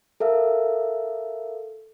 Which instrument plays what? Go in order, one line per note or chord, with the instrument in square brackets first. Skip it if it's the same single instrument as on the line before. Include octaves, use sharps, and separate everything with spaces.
[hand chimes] A4 A#4 E5 F5